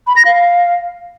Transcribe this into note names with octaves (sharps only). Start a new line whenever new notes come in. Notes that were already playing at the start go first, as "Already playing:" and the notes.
B5
A#6
F5